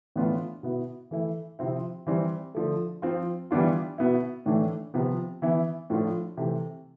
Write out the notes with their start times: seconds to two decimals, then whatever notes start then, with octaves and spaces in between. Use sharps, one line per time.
0.16 A2 E3 B3 D4 F4
0.63 B2 B3 E4
1.11 E3 A3 E4
1.59 C3 F3 C4 E4
2.07 E3 G3 C4
2.55 D3 F3 A3
3.02 F3 C4 F4
3.51 E3 G3 B3 D4 F4
3.98 B2 B3 E4
4.46 A2 E3 A3 D4
4.94 C3 F3 B3
5.42 E3 B3 E4
5.90 A2 F3 A3 D4 F4
6.37 C3 E3 A3